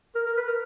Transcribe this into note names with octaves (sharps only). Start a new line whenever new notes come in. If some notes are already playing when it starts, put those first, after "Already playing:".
A#4
A#4
B4
A#4